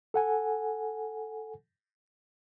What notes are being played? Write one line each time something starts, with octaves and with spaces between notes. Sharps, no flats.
A4 F#5 G#5